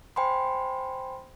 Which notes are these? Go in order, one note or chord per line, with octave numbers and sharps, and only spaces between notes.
C5 G5 G#5 B5 C6